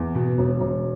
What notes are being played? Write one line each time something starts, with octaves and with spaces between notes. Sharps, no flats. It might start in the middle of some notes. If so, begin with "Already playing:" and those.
Already playing: E2
B2
E1
E1